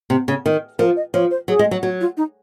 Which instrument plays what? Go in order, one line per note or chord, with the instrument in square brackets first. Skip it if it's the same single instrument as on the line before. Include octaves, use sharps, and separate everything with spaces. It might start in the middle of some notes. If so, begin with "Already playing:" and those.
[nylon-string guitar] C3
C#3
D#3
[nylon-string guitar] F3 [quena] A#4
[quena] D#5
[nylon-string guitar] F3 [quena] C#5
[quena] C5
[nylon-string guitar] F#3 [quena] G#4
[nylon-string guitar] G#3
F#3
[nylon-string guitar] F#3 [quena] F#4
[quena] F4
D#4